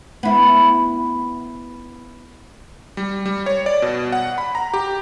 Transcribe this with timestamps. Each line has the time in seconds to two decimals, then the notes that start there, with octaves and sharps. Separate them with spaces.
0.23 B3 E4
2.97 G3
3.26 G3
3.46 C#5
3.66 D5
3.82 B2
4.12 F#5
4.38 B5
4.55 A#5
4.74 G4